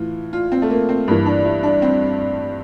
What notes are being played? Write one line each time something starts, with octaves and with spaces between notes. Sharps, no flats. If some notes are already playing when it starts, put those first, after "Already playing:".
Already playing: A2 E3 F4
F4
C4
A3
A#3
C4
G2 E3 A#3
D4
E4
D4
C4